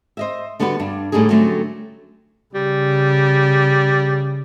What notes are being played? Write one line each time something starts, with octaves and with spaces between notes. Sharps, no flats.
C5 D#5 E5
D3 G3 B3 F#4 B4
G2 G3 D4
A2 D3 G3 D#4 G#4
D3 F#3 G3 A3 C4 C#4
C#3 G3